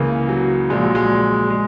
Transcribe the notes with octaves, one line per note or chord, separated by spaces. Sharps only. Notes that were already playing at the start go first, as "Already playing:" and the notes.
Already playing: C#2 C#3 E3 A#3
F#3
A#1 A#2 G#3
F#3
G#3
G#3